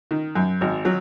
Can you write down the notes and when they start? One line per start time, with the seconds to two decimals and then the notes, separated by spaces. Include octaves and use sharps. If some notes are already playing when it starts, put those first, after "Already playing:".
0.11 D#3
0.35 F#2
0.61 G#1
0.85 F#3